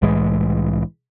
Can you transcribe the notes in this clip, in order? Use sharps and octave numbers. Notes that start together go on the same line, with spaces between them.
C2 A2 E3 G#3